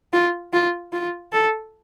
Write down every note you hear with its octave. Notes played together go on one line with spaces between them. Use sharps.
F4
F4
F4
A4